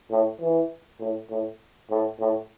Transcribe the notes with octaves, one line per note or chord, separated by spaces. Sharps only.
A2
E3
A2
A2
A2
A2